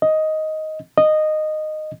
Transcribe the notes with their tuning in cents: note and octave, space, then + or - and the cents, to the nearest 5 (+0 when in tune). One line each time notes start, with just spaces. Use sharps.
D#5 +5
D#5 -15